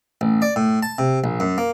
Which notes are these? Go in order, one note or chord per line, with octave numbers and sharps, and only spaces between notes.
A1
D5
A2
A5
C3
A#1
F#2
A#3